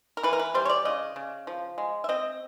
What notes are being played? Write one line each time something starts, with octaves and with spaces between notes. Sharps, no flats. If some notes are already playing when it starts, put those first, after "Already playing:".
A#4
E3 B4
A#4
B4
G3 C5
C#5
D5
C#3 D#5
C#3
F3
G#3
E5
C4 D#5